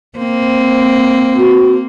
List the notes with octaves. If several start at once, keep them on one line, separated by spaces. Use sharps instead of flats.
A#3 C4
F#4